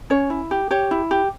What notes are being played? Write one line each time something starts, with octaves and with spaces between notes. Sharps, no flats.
C#4 C#5
E4
G4
G4 C#5
E4
G4